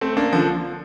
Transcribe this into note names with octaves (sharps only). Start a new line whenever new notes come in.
A3 C4
A#3 D4
D3 F3